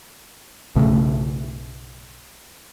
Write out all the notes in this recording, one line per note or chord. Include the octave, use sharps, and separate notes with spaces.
B1 G2 C#3 A3